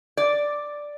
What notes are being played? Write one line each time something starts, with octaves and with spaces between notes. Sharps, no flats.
D5